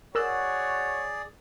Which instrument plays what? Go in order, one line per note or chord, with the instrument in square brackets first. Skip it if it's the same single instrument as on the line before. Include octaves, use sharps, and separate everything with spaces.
[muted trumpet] F#4 [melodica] G#4 D5 [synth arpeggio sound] A#4 E6 F#6 [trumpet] C#5